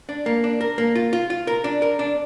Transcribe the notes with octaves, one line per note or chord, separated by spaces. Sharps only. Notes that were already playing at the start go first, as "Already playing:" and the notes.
D4
A#3
D4
A#4
A#3
F4
F4
F4
A#4
D4
A#4
D4